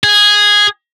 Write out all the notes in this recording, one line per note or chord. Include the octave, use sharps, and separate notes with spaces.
G#4